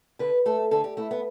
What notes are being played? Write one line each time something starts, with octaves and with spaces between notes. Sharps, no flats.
D3 B4
A3 A4
D3 A4
G4
A3 E4
B3